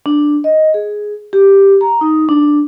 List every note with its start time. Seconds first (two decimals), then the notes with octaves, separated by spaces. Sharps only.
0.06 D4
0.44 D#5
0.74 G#4
1.33 G4
1.81 A#5
2.01 D#4
2.29 D4